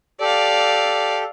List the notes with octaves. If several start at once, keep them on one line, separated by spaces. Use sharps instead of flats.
G4 A4 D5 F5